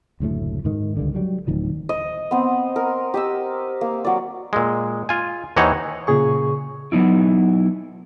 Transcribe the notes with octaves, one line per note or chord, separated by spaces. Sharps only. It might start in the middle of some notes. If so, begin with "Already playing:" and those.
F#1 D2 A2 A3
G#2 D#3
C#2 G2 D3
F#3 G3
D1 D#3 F3
D#5
B3 C4
A#4
G4 D#5 E6
A#3
F#3 D5
A#2 G#3
F4 G#5
D#2 E3 D#4 C5 C#5 F#5
A#2 C#3 G#4 C#6
F#3 B3 D#4 E4